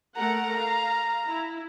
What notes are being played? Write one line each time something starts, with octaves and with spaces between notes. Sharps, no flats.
A3 A#4 F#5 A#5
F5
E4